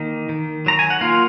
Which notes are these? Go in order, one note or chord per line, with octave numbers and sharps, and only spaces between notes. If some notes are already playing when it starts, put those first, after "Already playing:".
Already playing: D#3 A#3
D#3
F#3 A#5
G#5
F#5
A#3 F4 F5